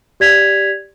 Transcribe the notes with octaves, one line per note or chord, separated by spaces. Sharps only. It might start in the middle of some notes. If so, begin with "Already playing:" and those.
G4 D5 G#6 B6 F7